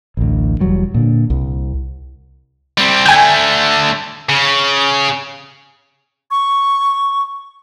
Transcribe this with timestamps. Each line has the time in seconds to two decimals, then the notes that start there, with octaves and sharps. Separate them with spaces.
0.17 A1 D2
0.60 E1 E2 F#3 G3
0.94 A#2 D3
1.30 C2
2.78 G3 C4
3.06 D3 A3 G5 G#5
4.29 C#3
6.31 C#6